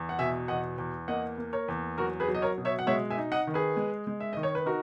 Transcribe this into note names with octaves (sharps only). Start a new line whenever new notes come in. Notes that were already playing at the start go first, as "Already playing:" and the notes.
Already playing: E2
F#5
B2 E5 G#5
E2 D#5 F#5
E2
A#3 D#5 F#5
A#3
A#4 C#5
E2
F#3 F#4 A#4
G#4 B4
F#3
D#5
A#4 C#5
B2
C#5 E5
F#5
G#3 C#5 E5
E5 G#5
D#4
D#5 F#5
D#3
G#4 B4
G#3
G#3
E5
D#3 D#5
C#5
B4
D#4 F#4 A#4